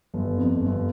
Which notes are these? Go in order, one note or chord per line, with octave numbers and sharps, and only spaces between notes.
G1
F2
G1